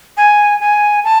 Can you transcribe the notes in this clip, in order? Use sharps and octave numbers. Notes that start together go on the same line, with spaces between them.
G#5
G#5
A5